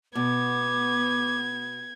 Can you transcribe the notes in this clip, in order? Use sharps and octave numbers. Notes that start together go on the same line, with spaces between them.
B2 B3 D6 G#6